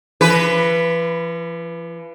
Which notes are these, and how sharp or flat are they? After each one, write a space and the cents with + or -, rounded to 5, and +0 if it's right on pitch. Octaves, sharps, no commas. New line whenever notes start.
F3 -45 B4 +0